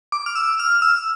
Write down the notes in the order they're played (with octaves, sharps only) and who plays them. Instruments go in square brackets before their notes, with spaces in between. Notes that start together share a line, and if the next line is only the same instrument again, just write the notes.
[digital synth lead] D6
F6
E6
F6
E6